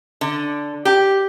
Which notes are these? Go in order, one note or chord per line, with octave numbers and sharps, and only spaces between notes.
D3
G4